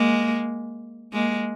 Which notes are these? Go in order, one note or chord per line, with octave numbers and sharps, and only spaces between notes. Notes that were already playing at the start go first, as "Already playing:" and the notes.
Already playing: G#3 A#3
G#3 A#3